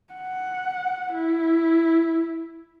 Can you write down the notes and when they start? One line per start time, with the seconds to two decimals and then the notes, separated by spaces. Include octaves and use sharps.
0.14 F#5
1.14 E4